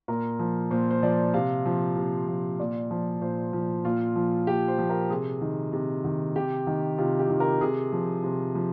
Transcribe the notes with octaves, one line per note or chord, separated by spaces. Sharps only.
A#2 A#4
F3
A#2 C5
C5
F3 D5
C3 F5
F3
C3
F3
A#2 D5
F3
A#2 C5
F3
A#2 F4
F3
A#2 G4
C5
F3
A#4
C3 G#4
D#3
C3
D#3
C3 G4
D#3
C3 F4
G4
D#3
A#4
C3 G#4
F3
C3
F3